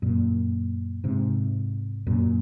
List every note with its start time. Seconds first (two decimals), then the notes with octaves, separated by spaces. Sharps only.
0.02 F#2 A#2
1.04 G#2 C3
2.07 F#2 A#2